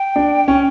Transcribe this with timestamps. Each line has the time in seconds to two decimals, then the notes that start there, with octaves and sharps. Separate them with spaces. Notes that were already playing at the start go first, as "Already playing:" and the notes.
Already playing: G5
0.16 D4
0.48 C#4